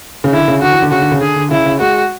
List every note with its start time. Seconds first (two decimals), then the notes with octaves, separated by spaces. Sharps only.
0.24 C#3
0.33 D3 E4
0.48 C#3
0.62 D3 F#4
0.72 E3
0.82 D3
0.91 C#3 F#4
1.02 D3
1.12 C#3
1.21 D3 G#4
1.36 D3
1.51 C#3 E4
1.65 C#3
1.80 G#3 F#4